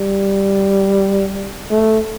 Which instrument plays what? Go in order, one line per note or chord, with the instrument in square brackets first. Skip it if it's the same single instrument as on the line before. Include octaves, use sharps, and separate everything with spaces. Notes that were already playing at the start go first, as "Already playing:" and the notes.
Already playing: [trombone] G3
A3